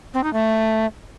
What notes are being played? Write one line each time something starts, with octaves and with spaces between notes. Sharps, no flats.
C4
D#4
A3